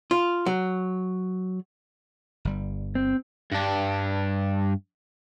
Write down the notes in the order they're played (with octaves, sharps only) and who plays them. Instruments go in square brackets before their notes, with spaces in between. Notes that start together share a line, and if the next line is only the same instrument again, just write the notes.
[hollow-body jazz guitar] F4
F#3
[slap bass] G1 G3
[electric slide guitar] C4
[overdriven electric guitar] G2 D4